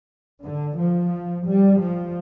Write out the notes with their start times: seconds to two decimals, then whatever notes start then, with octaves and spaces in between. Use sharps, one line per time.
0.41 D3
0.76 F3
1.45 G3
1.79 F3